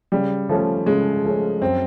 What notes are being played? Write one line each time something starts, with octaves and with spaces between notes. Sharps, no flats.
C#3 G3
F3 A3 C#4
C#3 G#3
F3 A3 C#4
F#2 C4